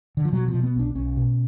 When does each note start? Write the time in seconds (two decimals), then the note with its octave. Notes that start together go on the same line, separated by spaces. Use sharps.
0.17 D3
0.25 F3
0.33 B2 F#3
0.48 F3
0.54 B2
0.63 B3
0.75 B1 D4
0.95 B1 C#4
1.17 B2